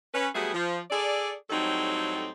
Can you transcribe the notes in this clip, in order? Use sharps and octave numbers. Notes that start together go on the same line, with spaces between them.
C#4 B4
F#3 G3 A3 B3 G#4
F3
G#4 A4 D5
A2 F#3 G3 C4 D#4 A4